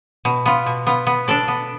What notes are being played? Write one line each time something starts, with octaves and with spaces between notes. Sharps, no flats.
B2
B3 F4
B2
B3 F4
B3
D4 A4 D5
B3